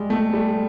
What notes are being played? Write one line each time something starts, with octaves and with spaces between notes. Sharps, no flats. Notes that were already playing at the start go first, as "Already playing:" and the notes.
Already playing: G3 G#3
A3
G3